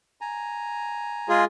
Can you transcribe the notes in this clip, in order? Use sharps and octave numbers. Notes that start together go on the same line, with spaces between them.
G#5 A#5
G#3 F4 G#4